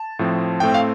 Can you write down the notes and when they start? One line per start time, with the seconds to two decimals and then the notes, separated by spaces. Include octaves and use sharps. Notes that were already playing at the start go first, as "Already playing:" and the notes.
Already playing: A5
0.19 A2 F3 C4
0.60 A2 A3 C4 G5
0.74 F5